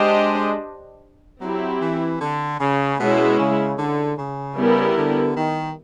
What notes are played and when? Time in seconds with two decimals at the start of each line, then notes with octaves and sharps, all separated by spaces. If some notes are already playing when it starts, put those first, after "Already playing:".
Already playing: G#3 D4 G4 C5 D#5
1.41 F#3 C4 E4 G4
1.81 E3
2.21 D3
2.60 C#3
2.99 B2 G#3 C#4 E4
3.39 C#3
3.78 D3
4.18 C#3
4.57 G3 B3 E4 G4 A#4
4.97 D3
5.37 D#3